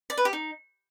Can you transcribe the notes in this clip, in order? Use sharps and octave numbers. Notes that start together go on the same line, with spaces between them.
D5
B4
G4
D#4